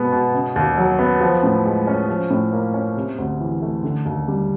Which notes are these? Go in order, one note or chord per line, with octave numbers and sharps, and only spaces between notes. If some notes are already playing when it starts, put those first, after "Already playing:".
Already playing: B2 G#3 B3
B2
C#3
D#2
F#3
B3
F3
A2
G#3
C#4
F3
A2
A#3
C#4
C3
D2
E3
A3
D3
D#2
G3